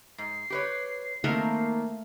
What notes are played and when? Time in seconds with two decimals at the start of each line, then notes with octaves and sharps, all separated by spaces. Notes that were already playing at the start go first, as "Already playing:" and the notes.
0.18 G#2 C7
0.50 G4 B4 C#5
1.24 D#3 A3 A#3 C4 A#4